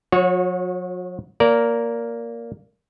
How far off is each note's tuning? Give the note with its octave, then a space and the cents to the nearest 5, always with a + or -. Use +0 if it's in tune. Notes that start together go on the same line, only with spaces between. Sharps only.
F#3 -45 F#4 -30 C#5 +0
A#3 +0 A#4 +0 D5 -25